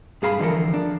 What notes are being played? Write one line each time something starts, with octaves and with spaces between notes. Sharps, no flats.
G2 G#4 F5 A#5 B5
D3 E3 F3 A4 A#4
D4